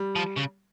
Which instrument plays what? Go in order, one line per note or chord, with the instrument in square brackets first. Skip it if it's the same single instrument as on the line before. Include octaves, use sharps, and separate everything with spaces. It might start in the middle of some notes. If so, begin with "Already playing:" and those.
Already playing: [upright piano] G3
[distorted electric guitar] F3
C#3